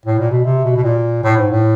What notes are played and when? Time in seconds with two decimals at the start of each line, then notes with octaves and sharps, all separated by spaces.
0.05 A2
0.19 A#2
0.31 B2
0.45 C3
0.65 B2
0.76 B2
0.84 A#2
1.23 A2
1.37 G#2
1.50 A2